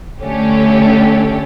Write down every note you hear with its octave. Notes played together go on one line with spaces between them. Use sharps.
D3 A3 C#4 G4